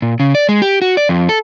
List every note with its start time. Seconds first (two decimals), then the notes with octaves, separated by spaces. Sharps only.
0.02 A#2
0.20 C#3
0.35 D5
0.49 G#3
0.62 G4
0.82 F#4
0.97 D5
1.09 F2
1.29 A4